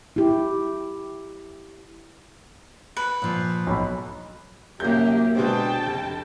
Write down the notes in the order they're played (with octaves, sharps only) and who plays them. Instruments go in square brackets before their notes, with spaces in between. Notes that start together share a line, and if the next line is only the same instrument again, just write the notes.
[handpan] E4 G4
[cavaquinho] B4
[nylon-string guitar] A#2 F3
[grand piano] B1 B5
[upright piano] C2 G6 [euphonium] F#2 [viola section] A#3 G4
[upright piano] B2 G#3 C4 [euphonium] D4 [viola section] G5 A5
[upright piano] F1